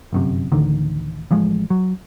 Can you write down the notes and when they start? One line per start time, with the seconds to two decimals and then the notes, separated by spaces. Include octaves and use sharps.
0.13 G1 F#2 C3
0.52 A1 D2 D3 D#3
1.31 A1 F3 G#3
1.70 F#3